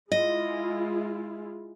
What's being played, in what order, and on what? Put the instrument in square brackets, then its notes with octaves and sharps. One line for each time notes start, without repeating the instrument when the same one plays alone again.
[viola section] G#3 E4 F4 [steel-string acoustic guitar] D#5